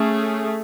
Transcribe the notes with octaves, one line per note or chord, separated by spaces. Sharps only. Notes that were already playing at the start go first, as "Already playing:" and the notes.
Already playing: A3 C#4 G#4